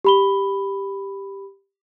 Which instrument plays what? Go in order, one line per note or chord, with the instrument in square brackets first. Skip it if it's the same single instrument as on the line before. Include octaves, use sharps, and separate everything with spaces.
[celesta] G4 B5 G7